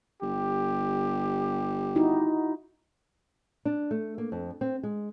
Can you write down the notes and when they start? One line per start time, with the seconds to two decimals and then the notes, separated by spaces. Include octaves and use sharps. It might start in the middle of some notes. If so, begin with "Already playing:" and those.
0.22 G1 G4
1.96 D#4 E4 F#4
3.65 D4
3.91 A3
4.18 A#3
4.32 F2
4.61 C4
4.83 G#3